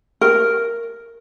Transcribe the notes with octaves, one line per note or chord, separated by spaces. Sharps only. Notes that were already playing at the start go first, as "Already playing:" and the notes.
A#4